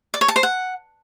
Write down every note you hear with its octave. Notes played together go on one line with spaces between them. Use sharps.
D5
C#5
A5
C5
F#5